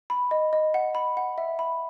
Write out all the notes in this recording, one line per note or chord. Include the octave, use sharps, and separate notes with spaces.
B5
D#5
D#5
F#5
B5
F#5
E5
B5